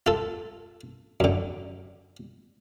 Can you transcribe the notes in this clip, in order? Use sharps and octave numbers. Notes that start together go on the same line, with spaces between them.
F4 A4
F#2 D3